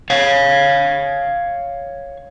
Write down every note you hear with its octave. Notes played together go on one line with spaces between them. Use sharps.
C#5 F5